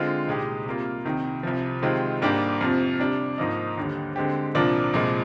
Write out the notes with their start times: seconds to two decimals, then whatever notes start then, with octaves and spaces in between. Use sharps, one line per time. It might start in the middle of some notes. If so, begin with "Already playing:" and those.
Already playing: D3 G#3 C4 F4
0.27 C2 A#2 G#3 D#4 G4
0.66 C3 G3 A#3 F4
1.05 C2 C3 D#3
1.43 C2 C3 F3
1.82 C3 D#3 G#3 C4 F4
2.22 G#2 G3 A#3 D4 G4
2.61 F2 C3 F3
3.00 C3 G3 D4
3.38 G#2 F3 A#3 D#4
3.77 D#2 D3 G3
4.16 D3 G#3 C4 G4
4.55 C2 A#2 F3 A#3 D4
4.93 C2 A#2 F3 G#3